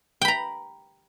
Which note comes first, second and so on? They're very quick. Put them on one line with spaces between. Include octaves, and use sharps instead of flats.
G5 B5 A#5